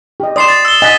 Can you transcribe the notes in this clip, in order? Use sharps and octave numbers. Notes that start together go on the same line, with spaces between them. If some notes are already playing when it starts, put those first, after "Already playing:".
G4 D#5
D5 C6 D#6 C7 E7
A6
E6 G7
D#5 F#5 G#5 A6 B6